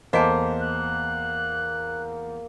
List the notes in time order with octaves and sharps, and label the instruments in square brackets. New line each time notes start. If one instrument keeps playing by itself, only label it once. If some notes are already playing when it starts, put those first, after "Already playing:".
[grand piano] E2 C5 B6 [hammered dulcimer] A#3 [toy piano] D#5 G#5 A5
[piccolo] F#6